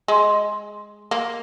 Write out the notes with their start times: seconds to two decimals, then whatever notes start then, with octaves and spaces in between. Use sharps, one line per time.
0.08 G#3
1.11 A#3